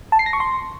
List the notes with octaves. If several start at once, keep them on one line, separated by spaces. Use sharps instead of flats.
A5
C7
A#6
C#6
C6